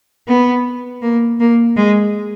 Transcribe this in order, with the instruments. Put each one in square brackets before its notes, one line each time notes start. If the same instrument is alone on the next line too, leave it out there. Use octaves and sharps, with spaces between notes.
[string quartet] B3
A#3
A#3
G#3